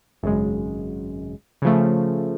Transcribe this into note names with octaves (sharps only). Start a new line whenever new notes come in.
G#1 F#2 C#3 G#3
C#3 F3 A3